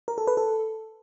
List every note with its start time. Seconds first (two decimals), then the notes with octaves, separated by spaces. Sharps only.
0.08 A#4
0.18 A4
0.27 B4
0.37 A4